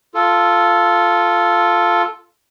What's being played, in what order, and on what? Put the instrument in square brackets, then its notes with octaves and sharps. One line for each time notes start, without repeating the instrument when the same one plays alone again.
[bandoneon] F4 A4